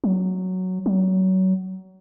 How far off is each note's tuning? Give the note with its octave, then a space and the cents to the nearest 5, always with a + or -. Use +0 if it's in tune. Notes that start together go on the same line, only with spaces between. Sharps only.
F#3 +0
F#3 +25